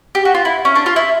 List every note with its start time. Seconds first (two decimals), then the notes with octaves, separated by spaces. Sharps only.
0.15 G4
0.25 F#4
0.35 F4
0.45 E4
0.65 C#4
0.75 D4
0.86 F4
0.96 E4